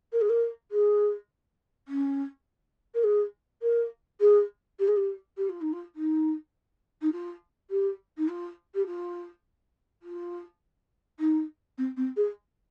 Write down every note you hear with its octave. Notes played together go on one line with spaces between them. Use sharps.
A#4
G#4
A#4
G#4
C#4
A#4
G#4
A#4
G#4
G4
G#4
G4
G4
F4
D#4
F4
D#4
D#4
F4
G4
D#4
F4
G4
F4
F4
D#4
C4
C4
G#4